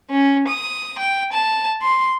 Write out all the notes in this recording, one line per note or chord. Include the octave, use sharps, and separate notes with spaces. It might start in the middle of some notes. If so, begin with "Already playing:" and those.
C#4
D#6
G5
A5
C6